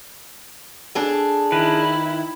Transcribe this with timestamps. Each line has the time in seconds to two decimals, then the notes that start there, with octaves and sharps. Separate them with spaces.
0.95 D4 G#4 A4
1.52 D#3 E4 B4